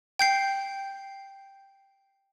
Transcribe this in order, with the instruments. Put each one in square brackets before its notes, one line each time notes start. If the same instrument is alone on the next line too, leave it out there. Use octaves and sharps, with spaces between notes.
[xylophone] G5 G6 C7